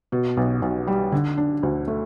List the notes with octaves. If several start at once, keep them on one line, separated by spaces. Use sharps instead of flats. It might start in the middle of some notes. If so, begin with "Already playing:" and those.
B2
B1
B1
G3
D3
D4
D2
A3